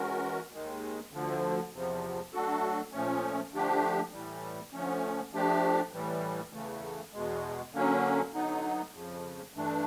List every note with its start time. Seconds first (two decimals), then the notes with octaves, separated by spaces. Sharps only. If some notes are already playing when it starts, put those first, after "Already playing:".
Already playing: E3 G#3 C#4 F#4 A#4
0.52 D#2 D#3 G#3
1.12 D2 D3 F3
1.72 E2 C3 F3
2.33 F#3 A3 D4 F#4 A4
2.92 A#2 F3 A3 C#4
3.53 D3 F3 A3 D4 G4
4.13 A2 E3 G3
4.73 D3 F3 A3 C#4
5.33 F3 A3 D4 G4
5.93 A2 E3 G3
6.53 E2 C#3 E3 A3
7.13 E2 B2 G#3
7.73 D3 F#3 A#3 C#4
8.33 D3 F#3 B3 D#4
8.94 F2 C#3 F3
9.53 G2 E3 A3 D4